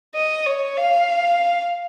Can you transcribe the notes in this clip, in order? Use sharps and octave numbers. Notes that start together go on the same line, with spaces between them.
D#5
C#5
F5